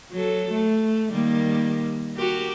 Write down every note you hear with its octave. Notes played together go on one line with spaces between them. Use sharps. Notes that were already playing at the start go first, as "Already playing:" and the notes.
F#3 A4
A3
D#3 G3 A#3
F#4 G4 A#4